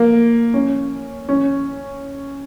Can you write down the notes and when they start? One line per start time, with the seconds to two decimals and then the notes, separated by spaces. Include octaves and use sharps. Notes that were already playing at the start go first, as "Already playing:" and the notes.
Already playing: A#3
0.54 C#4
1.29 C#4